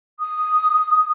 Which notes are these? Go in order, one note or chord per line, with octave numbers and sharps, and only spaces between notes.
D#6